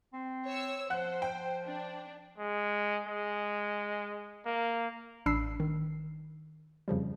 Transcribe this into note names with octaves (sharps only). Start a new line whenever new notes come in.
C4
C#5 E6
F3 C5 F#5 F#6
G5
D4
G#3
G#3
A#3
A1 D4 B5 E6 C7
D#3
F2 C#3 F3 G3